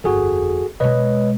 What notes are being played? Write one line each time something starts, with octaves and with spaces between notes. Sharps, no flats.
G1 F2 F#4 G#4 A4
B2 G#3 B4 C#5 D#5